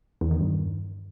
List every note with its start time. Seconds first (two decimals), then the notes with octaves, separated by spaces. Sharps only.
0.21 E2
0.31 D#3
0.41 G2